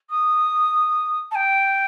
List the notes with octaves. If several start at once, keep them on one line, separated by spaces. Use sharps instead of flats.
D#6
A5
G5